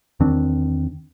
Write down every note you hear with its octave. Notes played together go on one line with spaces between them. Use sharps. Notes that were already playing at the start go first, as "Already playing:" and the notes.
E2 D#3 C4 D4